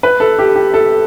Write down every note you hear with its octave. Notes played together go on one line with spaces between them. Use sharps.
B4
A4
G4
G4
A4